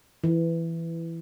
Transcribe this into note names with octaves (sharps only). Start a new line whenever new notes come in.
E3